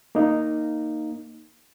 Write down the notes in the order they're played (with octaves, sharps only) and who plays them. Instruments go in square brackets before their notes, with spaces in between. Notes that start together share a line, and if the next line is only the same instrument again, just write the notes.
[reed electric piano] A#3 D#4